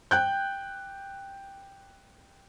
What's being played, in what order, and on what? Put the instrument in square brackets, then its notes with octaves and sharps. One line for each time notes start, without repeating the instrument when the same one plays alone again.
[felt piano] G5 F#6 G6